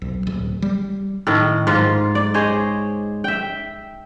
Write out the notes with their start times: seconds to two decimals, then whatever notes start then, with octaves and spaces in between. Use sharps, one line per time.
0.02 B1
0.27 D1
0.62 G3
1.27 A2 D#3
1.67 G#2 F4
2.15 D5
2.34 G#4 C5 C#5 D#5
3.24 E5 G5